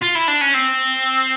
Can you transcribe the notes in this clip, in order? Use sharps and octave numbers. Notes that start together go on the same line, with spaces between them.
F4
E4
D4
C#4
C4